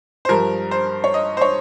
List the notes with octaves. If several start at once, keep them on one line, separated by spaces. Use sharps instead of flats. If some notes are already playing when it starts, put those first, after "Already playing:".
C5
G2 F3 A#4
C5
C#5
D#5
C5
C#5